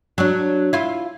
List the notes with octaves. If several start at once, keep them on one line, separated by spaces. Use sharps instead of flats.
F#3 D4
E4 F4